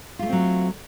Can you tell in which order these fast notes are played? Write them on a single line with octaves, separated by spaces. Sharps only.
F4 G3 A3 C4 F#3